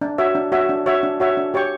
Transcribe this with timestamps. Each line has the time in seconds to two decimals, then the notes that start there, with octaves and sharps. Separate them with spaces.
0.01 D4
0.18 F#4 C#5 E5
0.35 D4
0.52 F#4 C#5 E5
0.69 D4
0.86 F#4 C#5 E5
1.03 D4
1.20 F#4 C#5 E5
1.37 D4
1.54 G4 C#5 G5 C#6